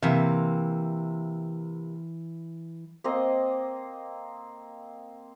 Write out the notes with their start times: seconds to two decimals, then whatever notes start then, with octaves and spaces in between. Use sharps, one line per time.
0.02 C3 E3 A#3 E5
3.04 A#3 C4 D#5